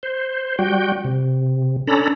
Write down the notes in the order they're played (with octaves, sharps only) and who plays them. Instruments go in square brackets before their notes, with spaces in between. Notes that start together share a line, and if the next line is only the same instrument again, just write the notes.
[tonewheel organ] C5
G3 F#4 G5
C3
C#4 D4 A4 A#5 B5